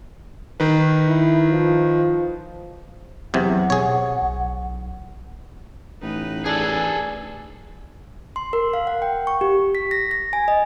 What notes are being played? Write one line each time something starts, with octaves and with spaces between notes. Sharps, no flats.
D#3 D#4 B4
E4
F3
E2 C3 F#3 F#5
B2 G#4 C#5
B1
A1 D#4 B4
D4 G#4 A4
C6
A#4
F5
F#5
G5
C#6
G4
B6
A#6
A#6
G#5
D#5